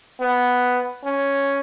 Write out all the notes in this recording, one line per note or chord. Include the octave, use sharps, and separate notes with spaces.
B3
C#4